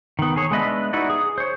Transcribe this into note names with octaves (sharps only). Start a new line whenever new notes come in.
D#3 B3
G#4 C#5
G#3 B3 D4 B4 D#5 E5
D#4 E4 F#4 B4 D5
G#4
C5 C#5